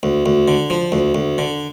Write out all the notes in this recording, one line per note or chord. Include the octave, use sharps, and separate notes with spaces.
D2
D2
D3
F3
D2
D2
D3